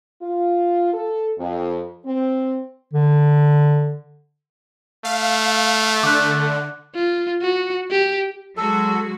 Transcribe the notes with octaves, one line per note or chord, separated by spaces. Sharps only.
F4
A4
F2
C4
D3
A3 F5
D3 D6 F#6
F4
F#4
G4
F#3 G#3 F#4 A4